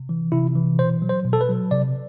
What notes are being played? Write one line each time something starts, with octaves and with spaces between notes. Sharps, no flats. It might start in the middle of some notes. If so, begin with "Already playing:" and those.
Already playing: C3
E3
C3 E4
E3
B2 C5
F#3
C5
B2
A4
B4
F#3
C3 D5